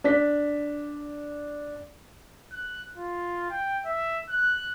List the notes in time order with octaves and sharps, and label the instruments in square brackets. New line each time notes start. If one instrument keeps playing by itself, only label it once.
[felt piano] D4 D5 B6
[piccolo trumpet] F#6
F4
G5
E5
F#6